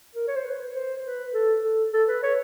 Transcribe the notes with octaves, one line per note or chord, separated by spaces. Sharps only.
A#4
C#5
C5
B4
C5
B4
A4
A4
A4
B4
C#5